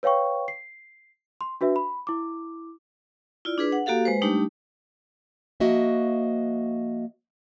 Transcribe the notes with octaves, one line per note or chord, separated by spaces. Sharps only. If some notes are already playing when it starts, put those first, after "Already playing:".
B4 C#5 F5 G5 C#6
C7
C6
D4 F#4 B4 E5
B5
E4 D6
E4 F4 D5
D4 G#4 B4
F#5
A#3 F#4 G4 A4 F5
G#3 B4 C5
G3 A3 D4 D#4 G4
F3 A#3 F#4 D#5 E5